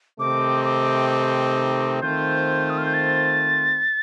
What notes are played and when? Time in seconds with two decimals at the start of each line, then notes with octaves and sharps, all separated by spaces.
0.20 C3 D#3 A3 C4 D#4 D6
0.65 D6
1.11 D6
2.02 D#3 A3 C4 F4 C5 G6
2.70 D#6
2.78 F6
2.86 G6
2.94 A6